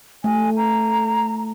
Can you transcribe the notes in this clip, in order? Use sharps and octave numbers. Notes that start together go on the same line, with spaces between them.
A3 G#5
A#5